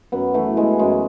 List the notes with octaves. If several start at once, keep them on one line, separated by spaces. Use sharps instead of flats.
F#2 B3
E3 A3
E3 G#3
F#2 G#3